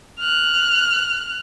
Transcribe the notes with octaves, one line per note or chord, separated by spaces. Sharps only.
F6 F#6